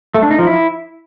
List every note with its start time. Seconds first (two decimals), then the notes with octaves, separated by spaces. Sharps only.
0.14 A3
0.23 D4
0.31 D#4
0.39 F3
0.47 E4